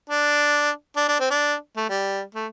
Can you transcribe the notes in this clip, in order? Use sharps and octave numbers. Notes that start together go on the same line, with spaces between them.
D4
D4
D4
C4
D4
A3
G3
A3